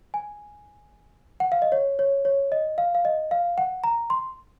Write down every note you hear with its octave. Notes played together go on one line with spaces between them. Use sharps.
G#5
F#5
F5
D#5
C#5
C#5
C#5
D#5
F5
F5
D#5
F5
F#5
A#5
C6